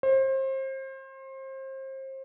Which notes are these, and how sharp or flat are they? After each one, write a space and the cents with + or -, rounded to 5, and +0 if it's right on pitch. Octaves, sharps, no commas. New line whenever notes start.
C5 +30